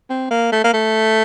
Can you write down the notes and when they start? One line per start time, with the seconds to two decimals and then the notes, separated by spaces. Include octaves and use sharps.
0.10 C4
0.31 A#3
0.52 A3
0.64 A#3
0.74 A3